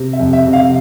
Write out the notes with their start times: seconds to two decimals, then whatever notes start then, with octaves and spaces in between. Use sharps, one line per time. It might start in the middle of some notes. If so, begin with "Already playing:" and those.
Already playing: C3
0.13 E5
0.20 F2
0.33 E5
0.47 C3
0.53 F5